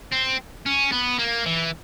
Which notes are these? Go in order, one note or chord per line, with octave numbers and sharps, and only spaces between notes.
C4
C#4
B3
A#3
E3